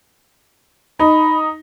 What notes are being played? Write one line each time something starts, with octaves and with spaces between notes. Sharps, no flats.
D#4 B5